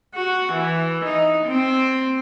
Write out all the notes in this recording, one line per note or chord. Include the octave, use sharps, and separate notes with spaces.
F#4
E3
D#4
C4